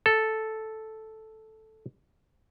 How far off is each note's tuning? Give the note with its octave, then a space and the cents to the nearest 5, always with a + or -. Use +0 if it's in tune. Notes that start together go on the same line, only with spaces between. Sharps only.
A4 -5